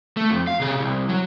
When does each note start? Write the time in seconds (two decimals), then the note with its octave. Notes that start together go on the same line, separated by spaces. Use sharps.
0.17 A3
0.30 F2
0.47 F5
0.60 C3 G#4
0.80 C2
1.09 F#3